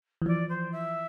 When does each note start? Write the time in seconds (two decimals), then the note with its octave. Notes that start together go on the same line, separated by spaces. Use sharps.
0.22 E3
0.26 F3 D5
0.49 C5
0.72 E5